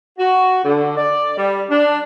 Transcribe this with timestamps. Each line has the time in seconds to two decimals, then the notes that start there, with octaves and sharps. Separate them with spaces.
0.18 F#4
0.64 D3
0.96 D5
1.36 G3
1.69 D4